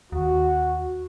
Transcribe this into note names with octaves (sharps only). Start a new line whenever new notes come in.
D#2 F#4